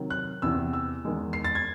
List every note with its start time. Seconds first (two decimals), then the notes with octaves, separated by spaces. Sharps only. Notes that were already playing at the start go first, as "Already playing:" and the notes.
Already playing: C3 D#3 F#3
0.10 F#6
0.42 E2 C3 E3 E6
0.73 E6
1.05 E2 D#3 G#3
1.33 C7
1.44 A6
1.55 G#6